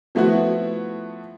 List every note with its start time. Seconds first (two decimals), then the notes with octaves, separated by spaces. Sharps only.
0.15 F3 A3 B3 E4 F#4